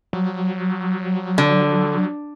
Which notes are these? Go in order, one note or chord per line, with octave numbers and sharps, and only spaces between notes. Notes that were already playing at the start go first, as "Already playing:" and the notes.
F#3
D3